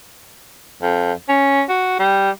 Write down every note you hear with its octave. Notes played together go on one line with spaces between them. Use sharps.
F2
C#4
F#4
G3